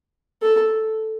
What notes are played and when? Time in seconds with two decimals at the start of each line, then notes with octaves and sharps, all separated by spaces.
0.42 A4